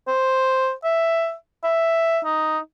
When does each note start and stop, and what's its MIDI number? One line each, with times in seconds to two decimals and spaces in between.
0.08 0.72 72
0.84 1.33 76
1.64 2.19 76
2.24 2.58 63